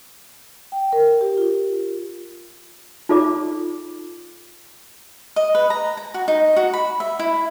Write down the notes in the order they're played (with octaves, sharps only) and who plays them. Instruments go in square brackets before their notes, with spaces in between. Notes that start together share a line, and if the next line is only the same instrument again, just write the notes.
[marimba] G5
A#4
G4
F4
[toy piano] D#4 F4 A4 D5 D6
[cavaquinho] D#5
B4
A#5
A#5
F#4
D#4
F#4
B5
E5
E4